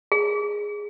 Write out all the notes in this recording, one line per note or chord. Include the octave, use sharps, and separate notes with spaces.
G#4